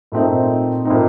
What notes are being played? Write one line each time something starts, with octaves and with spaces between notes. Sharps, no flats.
A#2 A3 C4 D#4
A#2 A3 C4 D#4